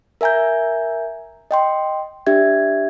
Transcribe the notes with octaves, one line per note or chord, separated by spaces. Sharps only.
A#4 E5 G#5 A#5 G6
D#5 G5 C6
D4 G4 E5 G#6